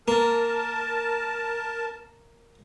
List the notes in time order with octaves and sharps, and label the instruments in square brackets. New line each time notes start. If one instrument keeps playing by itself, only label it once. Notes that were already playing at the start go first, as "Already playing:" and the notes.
[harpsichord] A#3 [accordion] A#4 A5